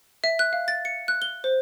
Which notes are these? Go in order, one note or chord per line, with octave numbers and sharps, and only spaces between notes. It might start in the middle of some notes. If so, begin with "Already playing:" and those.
E5
F#6
F5
A6
C#7
F#6
G7
C5